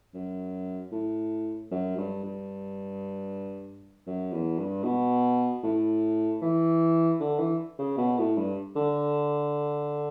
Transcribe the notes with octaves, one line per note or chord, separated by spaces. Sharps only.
F#2
A2
F#2
G2
G2
F#2
E2
G2
B2
A2
E3
D3
E3
C#3
B2
A2
G2
D3